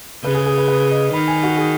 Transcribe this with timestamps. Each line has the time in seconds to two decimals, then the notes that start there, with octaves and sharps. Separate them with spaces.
0.23 C#3 B4
0.35 G#4
0.46 G#4
0.58 B4
0.68 B4
0.91 D#5
1.13 D#3 B5
1.28 G#5
1.43 F#4
1.57 G#4